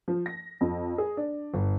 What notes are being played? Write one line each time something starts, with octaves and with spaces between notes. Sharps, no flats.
F3
A#6
F2
G#4
D4
G1